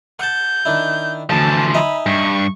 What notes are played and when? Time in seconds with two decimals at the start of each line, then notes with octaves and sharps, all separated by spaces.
0.19 F#5 A5 G6
0.65 D#3 D4 E4
1.30 D2 E3 F3 A5
1.74 D#4 E5 G#5 B5
2.06 G2 C#6